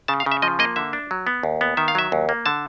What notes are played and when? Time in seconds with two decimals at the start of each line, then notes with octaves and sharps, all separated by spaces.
0.08 C#3 A5
0.20 F5
0.26 C#3
0.32 E5
0.42 F3 D#5
0.59 A#3 D#5
0.76 D3 E5
0.93 D4
1.11 F#3
1.27 B3
1.43 D#2
1.61 B3
1.77 D#3 E5
1.88 F5
1.95 F#3 E5
2.12 D#2
2.29 A#3
2.46 D3 A5